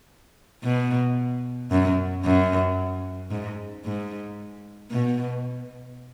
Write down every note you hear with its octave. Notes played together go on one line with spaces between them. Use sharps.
B2
F#2
F#2
G#2
G#2
B2